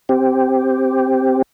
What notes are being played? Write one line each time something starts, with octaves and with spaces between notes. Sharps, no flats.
C4 G4